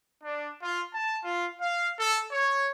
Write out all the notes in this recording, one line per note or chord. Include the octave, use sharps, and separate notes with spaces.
D4
F4
A5
F4
F5
A4
C#5